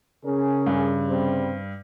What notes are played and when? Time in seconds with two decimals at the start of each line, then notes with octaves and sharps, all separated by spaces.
0.25 C#3 C#4 G#4 A#4
0.66 G2
1.09 C3 G3 C4